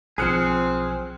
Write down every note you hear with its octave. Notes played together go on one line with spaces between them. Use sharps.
B1 F3 C4 G#4 F6 F#6 C#7